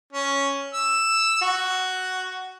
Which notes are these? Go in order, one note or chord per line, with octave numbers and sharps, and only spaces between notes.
C#4
E6
F#4